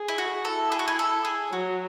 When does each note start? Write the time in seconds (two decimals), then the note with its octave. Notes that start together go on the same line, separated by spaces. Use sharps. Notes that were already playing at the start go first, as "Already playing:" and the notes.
Already playing: G#4
0.08 E4
0.18 F#4
0.45 E4 A4
0.72 G#4
0.79 F#4
0.88 G#4
0.99 A4
1.25 G#4
1.52 F#3 F#4